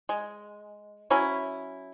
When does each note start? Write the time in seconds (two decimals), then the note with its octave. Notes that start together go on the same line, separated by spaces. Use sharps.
0.09 G#3
1.10 F#3 C#4 E4